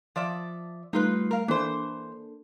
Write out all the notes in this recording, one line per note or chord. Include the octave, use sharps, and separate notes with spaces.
F3 D5 E5
G3 A3 D#4 F4 B4
A#4 F5
E3 A#3 D4 A4 C5